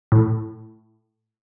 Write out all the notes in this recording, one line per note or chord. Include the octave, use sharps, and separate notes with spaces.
A2